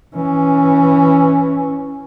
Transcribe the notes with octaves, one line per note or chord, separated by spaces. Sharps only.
E3 C#4